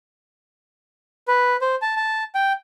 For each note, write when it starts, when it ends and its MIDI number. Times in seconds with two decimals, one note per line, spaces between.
1.28 1.56 71
1.61 1.75 72
1.82 1.95 81
1.96 2.24 81
2.35 2.53 79